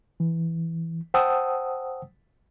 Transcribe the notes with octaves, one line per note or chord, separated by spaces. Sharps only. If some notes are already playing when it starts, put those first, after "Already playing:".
E3
C5 F#5 G5 A5 D#6 E6